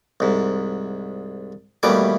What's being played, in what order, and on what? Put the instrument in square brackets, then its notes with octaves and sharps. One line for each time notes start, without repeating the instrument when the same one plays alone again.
[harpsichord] C2 G#2
D#2 B2 E3 G3 A3 D6